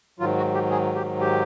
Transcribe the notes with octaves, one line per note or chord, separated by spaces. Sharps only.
G#2 D#3 F#3 F4
F#4
G4
G#4
G4
G4